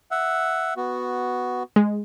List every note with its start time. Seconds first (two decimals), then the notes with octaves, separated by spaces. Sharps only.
0.11 E5 F#5
0.77 B3 F#4
1.76 G#3